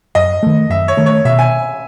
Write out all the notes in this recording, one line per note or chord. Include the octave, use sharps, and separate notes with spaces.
F#2 D#5
D#3 A3
F#2 E5
C#5
D#3 A3
C#5
B2 E5
G#5